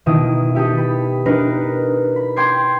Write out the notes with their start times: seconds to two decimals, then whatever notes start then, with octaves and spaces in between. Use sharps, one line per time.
0.06 B2 D#3 E4 D#6 D7
0.55 E4 G4 A4 D#6
0.77 B5
1.26 D4 D#4 A#4 B4
2.16 B5
2.36 G5 C6 D6 G#6 C7